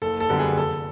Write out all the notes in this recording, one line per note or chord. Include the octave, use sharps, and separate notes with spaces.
F#1 A4
A4
F#2 D3 G3 B3
G#4
F1 A4